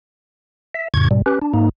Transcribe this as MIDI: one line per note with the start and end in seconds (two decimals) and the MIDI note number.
0.74 0.88 76
0.94 1.08 41
0.94 1.08 45
0.94 1.08 49
0.94 1.08 85
0.94 1.08 92
1.11 1.22 44
1.11 1.22 47
1.11 1.22 55
1.26 1.39 61
1.26 1.39 67
1.26 1.39 71
1.42 1.53 62
1.54 1.69 44
1.54 1.69 58
1.54 1.69 63